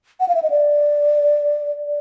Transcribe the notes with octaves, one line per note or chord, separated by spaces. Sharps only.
F#5
F5
E5
D#5
D5
D5